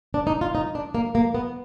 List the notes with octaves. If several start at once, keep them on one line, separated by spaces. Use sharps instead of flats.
D4
D#4
F4
D#4
D4
A#3
A#3
B3